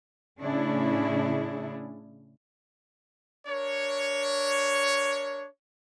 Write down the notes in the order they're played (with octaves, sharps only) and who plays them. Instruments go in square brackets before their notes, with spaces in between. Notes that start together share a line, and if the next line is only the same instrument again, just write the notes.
[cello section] A2 C#3 C#4 D4 E4 G#4
[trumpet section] D4 A#4 C#5